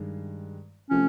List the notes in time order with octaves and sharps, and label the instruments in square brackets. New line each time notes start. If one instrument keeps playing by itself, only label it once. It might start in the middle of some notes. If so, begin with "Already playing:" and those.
Already playing: [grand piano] G2 D#3 G#3
[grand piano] C3 F3 A3 [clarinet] C#4